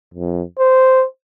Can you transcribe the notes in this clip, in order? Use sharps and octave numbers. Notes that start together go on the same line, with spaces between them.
F2
C5